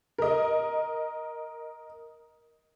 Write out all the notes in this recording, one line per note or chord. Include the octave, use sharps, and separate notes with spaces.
A#4 D#5